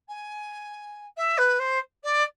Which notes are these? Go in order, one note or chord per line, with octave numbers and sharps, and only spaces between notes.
G#5
E5
B4
C5
D5